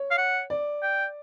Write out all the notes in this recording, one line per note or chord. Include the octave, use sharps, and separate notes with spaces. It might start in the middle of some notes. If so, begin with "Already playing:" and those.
Already playing: C#5
F5
F#5
D5
G5